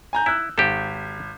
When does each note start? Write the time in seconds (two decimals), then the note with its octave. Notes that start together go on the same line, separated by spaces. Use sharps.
0.13 G#5 A#5 G6
0.26 E4 E6 F#6
0.58 G#1 G4 A4